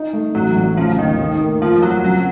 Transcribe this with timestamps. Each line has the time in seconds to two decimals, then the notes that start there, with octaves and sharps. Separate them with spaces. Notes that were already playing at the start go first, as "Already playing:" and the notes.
Already playing: D#4
0.13 A3
0.35 A1 F#3
0.56 A1
0.77 C#3 F3
0.98 D#2 D#3
1.19 A2
1.40 A#3
1.62 F2 F3
1.82 F#3 C4
2.04 C#3 F#3